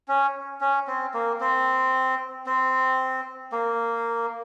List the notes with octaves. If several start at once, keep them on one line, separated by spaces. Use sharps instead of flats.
C#4
C#4
C4
A#3
C4
C4
A#3